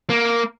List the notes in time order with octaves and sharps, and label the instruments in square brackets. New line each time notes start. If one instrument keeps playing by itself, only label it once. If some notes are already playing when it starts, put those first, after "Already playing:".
[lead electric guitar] A#3